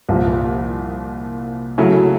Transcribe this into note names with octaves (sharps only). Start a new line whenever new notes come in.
C2 A#2 F3
C#3 F#3 A3 C#4 E4